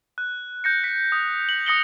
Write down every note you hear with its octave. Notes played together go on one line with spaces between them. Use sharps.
F#6
G6 A#6 C#7
B6
D#6
F#7
D#6 A#6 C#7 F#7 G7